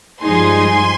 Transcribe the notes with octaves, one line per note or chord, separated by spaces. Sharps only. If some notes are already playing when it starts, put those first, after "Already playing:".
G2 F3 G#3 D#4 G#5 C6